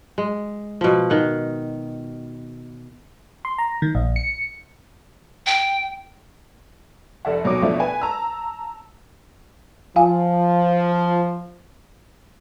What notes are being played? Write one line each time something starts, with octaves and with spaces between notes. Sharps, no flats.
G#3
B2 F3
D#3 F#5
C6
A#5
D#3
A#1
C#7
G5
F1 A4 D5 E5 F#5
D#2 B2 F#3 C#5 D6
B2 F3 A3 D4 E4 F4
B4 G#5
A5 A#5 E6
F3 F4 F5 G#5